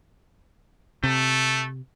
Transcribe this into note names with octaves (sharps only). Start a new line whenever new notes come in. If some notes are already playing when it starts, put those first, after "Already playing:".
C3 A3